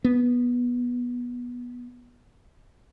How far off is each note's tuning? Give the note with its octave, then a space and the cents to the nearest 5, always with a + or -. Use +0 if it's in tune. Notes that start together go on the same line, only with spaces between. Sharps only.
B3 -15